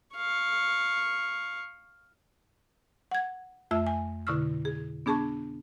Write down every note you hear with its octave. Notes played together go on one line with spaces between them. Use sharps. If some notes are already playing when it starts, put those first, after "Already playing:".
F5 C#6
F#5 G#6
F2 A3 F4 E5 E6
G#5
B2 D3 E4 C#6 E6 F6
G#4
B3 D4 G#4 A5 C#6